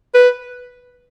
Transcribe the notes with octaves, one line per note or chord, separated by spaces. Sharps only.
B4